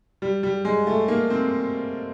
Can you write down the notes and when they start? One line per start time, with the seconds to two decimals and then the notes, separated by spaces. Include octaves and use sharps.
0.22 G3
0.43 G3
0.65 G#3
0.87 A3
1.08 A#3
1.30 C4